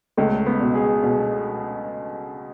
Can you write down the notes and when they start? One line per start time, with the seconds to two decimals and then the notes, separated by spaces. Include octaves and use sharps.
0.17 C#2 A3
0.46 B3
0.61 B2
0.75 G#4
1.04 B2